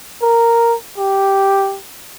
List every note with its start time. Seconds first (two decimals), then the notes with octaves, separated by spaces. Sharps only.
0.22 A#4
0.98 G4